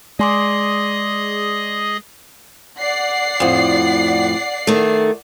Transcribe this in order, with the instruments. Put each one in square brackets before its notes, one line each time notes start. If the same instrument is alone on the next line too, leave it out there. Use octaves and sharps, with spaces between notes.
[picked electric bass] G#3 [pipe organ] G#4 D#5 D#6 [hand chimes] D5 C6 D6
[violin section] D5 F#5 C7
[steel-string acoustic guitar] F2 A2
D#3 A3